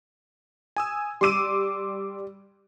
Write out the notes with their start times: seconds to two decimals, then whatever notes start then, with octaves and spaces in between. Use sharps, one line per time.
0.77 G#5 D#6 E6
1.21 G3 C6 D6 E6 D#7